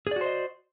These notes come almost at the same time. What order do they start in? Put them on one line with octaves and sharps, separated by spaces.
G#4 D5 F#4 C5 D#5